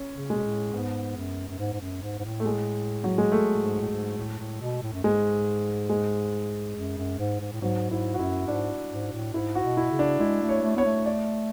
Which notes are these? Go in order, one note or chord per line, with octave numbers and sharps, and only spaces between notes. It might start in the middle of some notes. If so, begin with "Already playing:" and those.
Already playing: C#4
C#3
B2 G#3
A2
G#2 B3
F#2
F#2
G#2
G#2
F#2
G#2
G#2
A2
A3
G#3
F#3
G#3
A3
A2
G#2
A2
G#2
A2
A2
B2
A2
F#2
G#2 G#3
G#3
F#2
F#2
G#2
G#2
A2
G#2 F#3
G#2 E4
F#4
F#2 E4
G#2 D4
G#2
A2
G#2 E4
F#4
B2
E4
C#3
D4
G#3 E4
A3
C#5
A3
B3 C#5
A3
D5